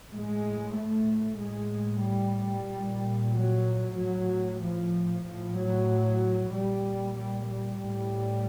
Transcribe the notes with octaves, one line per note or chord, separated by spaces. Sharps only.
A2 G#3
A3
A2 G#3
G3
A#2
F#3
A2 F#3
F3
A2 F3
F#3
A#2 G3
G3
G3
A2